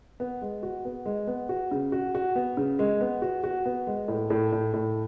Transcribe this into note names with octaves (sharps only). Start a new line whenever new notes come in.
B3
G#3
F#4
B3
G#3
B3
F#4
C#3
F#4
F#4
B3
C#3
G#3
B3
F#4
F#4
B3
G#3
A2
A2
A2
A2